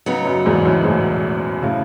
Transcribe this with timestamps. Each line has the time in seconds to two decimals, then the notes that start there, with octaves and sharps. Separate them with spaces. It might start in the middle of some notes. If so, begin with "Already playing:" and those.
0.06 C#3 F#3 B3 D#4
0.25 F#2
0.45 E2 G#2
0.65 F#2 A2
0.84 G#2 B2
1.62 A2 C#3